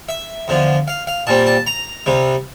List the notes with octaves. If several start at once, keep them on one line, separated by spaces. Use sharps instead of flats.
E5
E2 D3 F3
F5
F5
A#2 G3 C4 A5
A5
A#5
C2 C3 G3